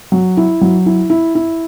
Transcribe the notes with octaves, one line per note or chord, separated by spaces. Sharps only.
F#3
E4
F#3
E4
E4
E4